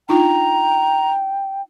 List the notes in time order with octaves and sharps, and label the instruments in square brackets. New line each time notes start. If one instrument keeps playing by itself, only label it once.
[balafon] D4 D#4 F4 [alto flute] G5 [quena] A#5